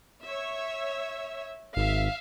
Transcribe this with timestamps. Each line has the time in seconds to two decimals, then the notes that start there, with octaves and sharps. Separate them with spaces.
0.24 C#5 E5
1.76 G#1 E5 F5